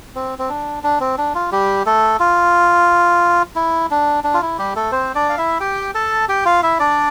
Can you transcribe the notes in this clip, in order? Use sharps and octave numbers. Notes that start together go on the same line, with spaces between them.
C4
C4
D4
D4
C4
D4
F4
G3 G4
A3 A4
F4
E4
D4
D4
F4
E4
G3 G4
A3 A4
C4 C5
D4 D5
F5
E4 E5
G4 G5
A4 A5
G4 G5
F4 F5
E4 E5
D4 D5